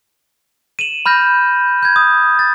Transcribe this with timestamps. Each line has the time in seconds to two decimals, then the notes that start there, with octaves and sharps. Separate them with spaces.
0.79 D#7 E7 F#7
1.06 B5 F6 G6 A#6
1.83 G6 G#6
1.96 D#6
2.39 A6